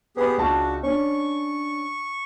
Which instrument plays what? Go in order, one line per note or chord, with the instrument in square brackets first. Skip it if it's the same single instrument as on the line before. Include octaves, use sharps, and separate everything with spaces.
[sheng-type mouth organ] B3 G4 G#4 [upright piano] B4 B5
[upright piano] C#2 A5 C#6 [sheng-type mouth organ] D4 F#4
[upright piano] C#4 D4 [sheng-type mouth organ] C#6